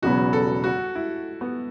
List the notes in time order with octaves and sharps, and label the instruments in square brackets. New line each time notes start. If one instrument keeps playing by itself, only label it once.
[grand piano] E1 E2 C#3 F#3 B3 [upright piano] F#4
[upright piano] A4
F#4
E4
B3